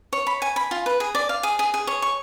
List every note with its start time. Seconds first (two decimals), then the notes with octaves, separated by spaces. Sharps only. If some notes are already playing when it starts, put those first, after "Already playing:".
0.13 C#5
0.27 B5
0.42 G#5
0.56 B5
0.71 F4
0.86 B4
1.00 G#4
1.15 D5
1.29 F5
1.43 G#4
1.59 G#4
1.74 G#4
1.87 C#5
2.02 C#6